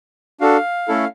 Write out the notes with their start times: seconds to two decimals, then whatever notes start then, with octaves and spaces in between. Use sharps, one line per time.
0.41 D4 F#4 A4 F5
0.88 A3 C#4 E4 A4